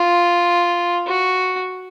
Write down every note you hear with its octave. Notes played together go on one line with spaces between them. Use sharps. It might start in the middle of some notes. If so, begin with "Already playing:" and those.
Already playing: F4
F#4